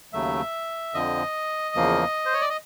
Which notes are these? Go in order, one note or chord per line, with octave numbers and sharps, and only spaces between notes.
D#2 C#3 F#3 A3 E5
F2 D3 F3 D#5
E2 C#3 F3 A#3
C5
C#5
D5
D#5